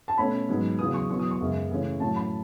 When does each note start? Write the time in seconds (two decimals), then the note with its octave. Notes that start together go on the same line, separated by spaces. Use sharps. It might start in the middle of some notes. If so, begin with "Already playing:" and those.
0.08 A5
0.18 B2 A3 C#4 B5
0.49 G#2 F#3 B3
0.79 E2 C#3 F#3 D#6
0.94 C#6
1.10 E2 B2 F#3 C#6
1.19 D#6
1.31 C#6
1.40 F#2 C#3 G#3 B3
1.70 C#3 E3 A3 C#4
2.00 A2 F#3 C#4 A5
2.16 B5